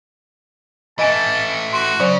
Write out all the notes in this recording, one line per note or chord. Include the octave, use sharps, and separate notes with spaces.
E3 A3 D#5 G#5 A5 D7
F#4 C6 D7
C#3 F#3 C#4 C5 D5